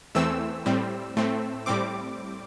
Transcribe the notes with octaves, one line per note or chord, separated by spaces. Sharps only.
E2 E3 A3 C4 E6
A2 G3 C4
A2 A3 C4
A2 G3 C4 D6